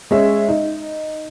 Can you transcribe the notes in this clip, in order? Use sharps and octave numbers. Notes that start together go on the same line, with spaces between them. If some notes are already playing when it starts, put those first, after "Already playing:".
G#3 C#4 E5
D#4